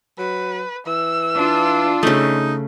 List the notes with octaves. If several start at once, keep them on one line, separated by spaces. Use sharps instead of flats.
F#3 B4
E3 E6
D4 F4
C#3 A3 D#4